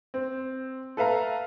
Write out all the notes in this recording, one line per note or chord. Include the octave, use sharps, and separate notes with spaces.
C4
A4 B4 E5 F5 A#5